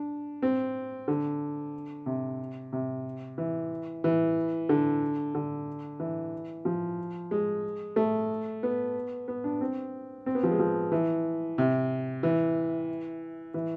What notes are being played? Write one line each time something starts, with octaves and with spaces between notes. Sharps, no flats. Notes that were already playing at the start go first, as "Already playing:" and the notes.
Already playing: D4
C4
D3
C3
C3
E3
E3
D3
D3
E3
F3
G#3
A3
B3
B3
D4
C4
C4
B3
F3
G#3
F3
E3
C3
E3
E3